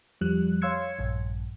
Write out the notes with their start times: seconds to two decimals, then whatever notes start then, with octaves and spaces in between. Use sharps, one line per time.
0.21 F2 F3 G3 F#6
0.62 C#5 F5 C6 E6 G#6 C#7
0.99 A#1 G2